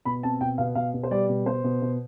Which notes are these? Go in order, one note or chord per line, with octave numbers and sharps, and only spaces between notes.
B2 B5
C4 A5
B2 G5
B2 F5
B2 F5
B2
C5
G3 D5
B2
B2 C5
B2
B2